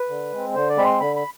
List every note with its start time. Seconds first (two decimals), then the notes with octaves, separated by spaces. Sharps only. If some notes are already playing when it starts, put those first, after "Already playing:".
Already playing: B4
0.09 D3
0.32 G#3 C4
0.55 D3 C5
0.69 D5
0.77 G#3 C4 B5
0.85 C6
1.00 D3 B5
1.16 B5